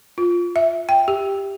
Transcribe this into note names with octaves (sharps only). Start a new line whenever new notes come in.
F4
E5
G5
G4